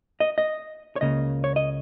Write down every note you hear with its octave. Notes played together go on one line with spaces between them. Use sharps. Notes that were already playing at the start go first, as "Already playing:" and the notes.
D#5
D#5
C#5
C#2 C#3 A#3 D#5
C#5
D#5